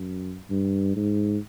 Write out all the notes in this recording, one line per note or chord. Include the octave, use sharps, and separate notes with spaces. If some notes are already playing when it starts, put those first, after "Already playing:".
Already playing: F#2
G2
G#2